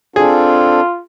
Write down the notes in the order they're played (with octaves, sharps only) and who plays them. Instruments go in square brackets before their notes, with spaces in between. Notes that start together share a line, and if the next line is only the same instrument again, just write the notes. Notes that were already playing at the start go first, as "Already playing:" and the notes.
[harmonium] C4 D4 A4 [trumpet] F4 [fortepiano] G#4